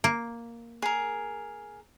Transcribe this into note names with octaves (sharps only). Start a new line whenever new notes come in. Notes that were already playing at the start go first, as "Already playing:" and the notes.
A#3
G#4 A#4